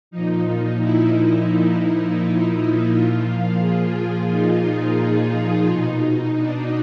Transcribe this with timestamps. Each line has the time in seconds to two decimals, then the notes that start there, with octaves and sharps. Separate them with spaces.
0.11 A#2 F3 D#4
0.81 E4
1.50 E4
2.20 E4
2.89 A#2 F3 F4
3.59 G#4
4.29 D#4
5.68 B2 D#4
6.37 D4